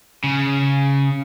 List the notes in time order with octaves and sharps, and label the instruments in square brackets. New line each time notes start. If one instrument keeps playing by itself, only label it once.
[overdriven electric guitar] C#3